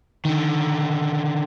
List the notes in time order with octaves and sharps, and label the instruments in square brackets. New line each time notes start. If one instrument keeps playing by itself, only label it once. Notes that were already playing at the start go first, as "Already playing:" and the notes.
[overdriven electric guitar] D3 D#3